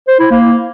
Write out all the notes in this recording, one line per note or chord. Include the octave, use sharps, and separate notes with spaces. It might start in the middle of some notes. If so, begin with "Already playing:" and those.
C5
E4
A#3